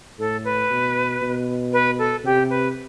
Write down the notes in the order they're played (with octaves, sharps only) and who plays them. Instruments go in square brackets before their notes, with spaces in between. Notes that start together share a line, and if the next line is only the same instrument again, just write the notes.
[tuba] A2 [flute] A4
[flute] B4
[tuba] B2
B2
[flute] B4
A4
[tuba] C3 [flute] G4
[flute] B4